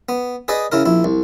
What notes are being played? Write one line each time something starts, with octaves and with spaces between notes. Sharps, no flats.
B3
G#4 B4 D5 D#5
C#3 E4 A#4
A#1 E4
C2